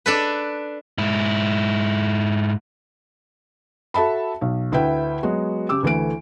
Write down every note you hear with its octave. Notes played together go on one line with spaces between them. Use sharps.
D4 A4 B4
G#2 E4
F#4 A4 E5 A5 B5
B1
D2 E4 B4 E5 G5
F#3 G#3 B3 F#4
C#3 G4 D6 E6
D2 E3 A3 D7